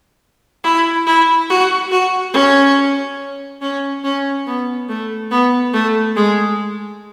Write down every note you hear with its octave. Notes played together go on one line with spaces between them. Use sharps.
E4
E4
F#4
F#4
C#4
C#4
C#4
B3
A3
B3
A3
G#3